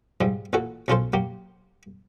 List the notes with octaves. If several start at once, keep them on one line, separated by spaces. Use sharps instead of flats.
G#2 F3 G3
A1 A#2 F#4 A4
B1 F3 C#4 F4 A4 C5
F#3 A#3 G4